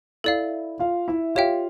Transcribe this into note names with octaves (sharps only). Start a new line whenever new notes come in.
E4 A4 D5 E5 F5
F4 F5
E4 E5
F4 G4 C#5 E5 F5 G5